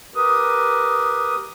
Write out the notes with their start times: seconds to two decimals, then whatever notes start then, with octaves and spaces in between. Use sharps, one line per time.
0.15 G4 A#4 B4 D#6